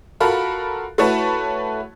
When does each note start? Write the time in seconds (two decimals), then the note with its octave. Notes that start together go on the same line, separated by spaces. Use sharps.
0.20 F4 F#4 A4 A#4 B5
0.98 A3 E4 F#4 B4 C#5 A5